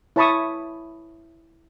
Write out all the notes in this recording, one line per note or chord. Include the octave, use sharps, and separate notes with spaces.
E4 C#5 A5 B5 C#6 D#6